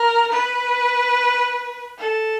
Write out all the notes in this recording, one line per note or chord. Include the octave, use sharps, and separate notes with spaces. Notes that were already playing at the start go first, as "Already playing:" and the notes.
Already playing: A#4
B4
A4